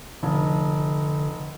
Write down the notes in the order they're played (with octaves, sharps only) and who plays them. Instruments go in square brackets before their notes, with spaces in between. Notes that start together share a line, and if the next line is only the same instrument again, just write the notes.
[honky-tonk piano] F1 [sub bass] D3